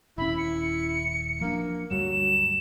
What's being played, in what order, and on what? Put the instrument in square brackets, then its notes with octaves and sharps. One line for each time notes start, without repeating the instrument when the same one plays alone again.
[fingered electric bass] D#1 C#4 [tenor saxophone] E4 [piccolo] B5
[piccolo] C#7
[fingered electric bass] F3 D4 [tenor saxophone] A#3
[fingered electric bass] D2 G2 G3 [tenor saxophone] F#3 [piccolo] E7